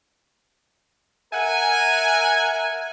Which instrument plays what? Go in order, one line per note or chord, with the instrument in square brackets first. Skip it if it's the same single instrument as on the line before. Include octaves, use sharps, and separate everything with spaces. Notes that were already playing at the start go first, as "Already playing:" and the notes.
[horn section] A#4 E5 F#5 G#5